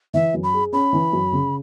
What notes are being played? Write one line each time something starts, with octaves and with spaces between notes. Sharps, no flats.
E3 E5
F#2
B5
G#4
C#4 B5
E3
F#2
C#3